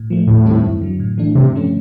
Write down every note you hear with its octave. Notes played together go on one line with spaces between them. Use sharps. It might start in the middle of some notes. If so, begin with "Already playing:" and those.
Already playing: A2
F3 A3
D#2 A2
D#3 G3 C4 E4
F#2
D3 F#3
A2
E3 A3 D4
G2 C3
D3 F3 A3 C#4